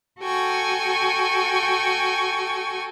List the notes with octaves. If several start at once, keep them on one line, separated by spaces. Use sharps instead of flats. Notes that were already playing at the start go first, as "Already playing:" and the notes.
F#4 A4 G5 G#5 C#6